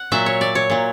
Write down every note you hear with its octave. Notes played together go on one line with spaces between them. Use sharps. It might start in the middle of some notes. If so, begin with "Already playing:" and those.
Already playing: F#5
A#2 F#3 E5
C#5
D5
C#5
A#2 F#3